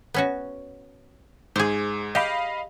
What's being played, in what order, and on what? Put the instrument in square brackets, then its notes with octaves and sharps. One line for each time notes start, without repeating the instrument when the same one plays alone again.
[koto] B3 C#4 F#4
[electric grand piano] G#2 [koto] G#4 C5
[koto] G4 [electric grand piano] D#5 F5 B5